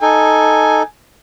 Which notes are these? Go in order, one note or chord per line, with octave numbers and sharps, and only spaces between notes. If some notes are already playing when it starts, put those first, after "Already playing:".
D#4 A4 G#5